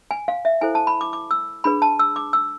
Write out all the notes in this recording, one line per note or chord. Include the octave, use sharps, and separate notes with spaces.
G#5
F5
E5
E4 A4 C5 G#5
A5
B5
D6
D6
E6
D4 G#4 B4 B5
A5
E6
D6
E6